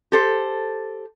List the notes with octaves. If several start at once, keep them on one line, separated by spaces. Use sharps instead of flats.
G4 A4 C5